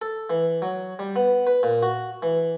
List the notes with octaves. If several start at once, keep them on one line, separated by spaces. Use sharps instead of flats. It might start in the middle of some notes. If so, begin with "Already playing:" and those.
A4
E3
F#3
G3
B3
B4
A#2
F#4
E3